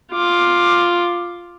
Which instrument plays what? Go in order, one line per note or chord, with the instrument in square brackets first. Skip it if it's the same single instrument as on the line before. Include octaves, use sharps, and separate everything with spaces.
[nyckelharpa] F4 D6